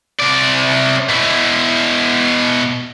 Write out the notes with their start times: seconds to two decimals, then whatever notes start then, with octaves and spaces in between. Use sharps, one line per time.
0.19 C3 D5
1.09 B2 E4